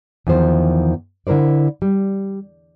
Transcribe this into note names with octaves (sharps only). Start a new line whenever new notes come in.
E2 D#3 F3 C5
D3 E4 A#4 C5 D5
G3